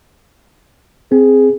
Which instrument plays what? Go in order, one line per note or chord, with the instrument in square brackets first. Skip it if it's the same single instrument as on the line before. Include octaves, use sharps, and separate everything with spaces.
[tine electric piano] C4 [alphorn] G#4